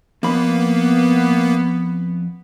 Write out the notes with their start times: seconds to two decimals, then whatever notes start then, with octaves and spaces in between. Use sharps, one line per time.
0.23 F2 A#3 B3 B5